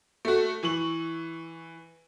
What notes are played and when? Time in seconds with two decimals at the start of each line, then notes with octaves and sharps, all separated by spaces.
0.25 A3 F#4
0.63 E3 C#6 F#7